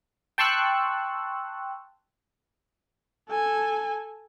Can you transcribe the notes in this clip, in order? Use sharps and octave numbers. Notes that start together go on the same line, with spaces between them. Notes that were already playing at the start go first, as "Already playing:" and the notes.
G5 A5 C6 C#6 E6 F#6
A4 G#5